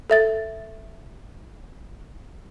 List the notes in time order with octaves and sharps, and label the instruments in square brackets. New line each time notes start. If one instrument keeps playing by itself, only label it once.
[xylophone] A4 E5 A6